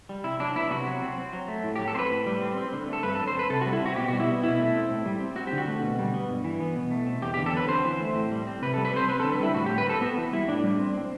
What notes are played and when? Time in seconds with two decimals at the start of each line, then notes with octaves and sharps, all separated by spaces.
0.09 G3
0.24 C3 E4
0.40 F#3 D4
0.56 B3 E4
0.71 C3 F#4
0.87 F#3
1.02 C4
1.18 C4
1.33 F#3
1.48 A3
1.63 A2
1.76 G4
1.79 F#3
1.88 A4
1.95 C4 C5
1.99 B4
2.11 A2
2.26 G3
2.42 C4
2.57 C4
2.73 D3
2.88 A3
2.93 A4
3.03 G2 B4
3.15 A4
3.19 F#3
3.27 C5
3.35 C4 B4
3.50 C3 A4
3.61 F#4
3.66 G3
3.73 E4
3.82 C4 F#4
3.96 B2 G4
4.08 F#4
4.13 G3
4.20 E4
4.27 B3
4.43 B2 E4
4.59 A3
4.75 C4
4.90 A2
5.06 G3
5.20 C4
5.36 C4 F#4
5.47 G4
5.52 D3
5.58 F#4
5.68 A3
5.82 B2
5.99 G3
6.14 B3
6.29 G2
6.44 E3
6.60 B3
6.76 B2
6.91 A3
7.07 C4
7.22 E2 G4
7.34 G4
7.37 D3
7.46 A4
7.53 F#3 B4
7.68 C4 C5
7.84 E3
8.00 A3
8.15 A2
8.32 G3
8.47 C4
8.62 C3 B4
8.74 A4
8.77 G3
8.85 B4
8.94 C4 C5
9.08 C4 B4
9.20 A4
9.24 D3
9.32 B4
9.39 G3 E4
9.55 A2 F#4
9.66 G4
9.71 G3
9.78 B4
9.87 C4 A4
10.01 B3 F#4
10.18 E3
10.33 G3 E4
10.48 A2 D4
10.64 G3
10.79 C4
10.94 C4